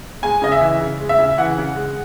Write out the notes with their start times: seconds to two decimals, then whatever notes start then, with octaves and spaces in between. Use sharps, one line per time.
0.23 G#3 G#5
0.42 C#3 D#5
0.52 E5
0.61 E3
0.80 C#3
1.00 G#3
1.09 E5
1.19 C#3
1.38 E3 F#5
1.57 C#3
1.76 G#3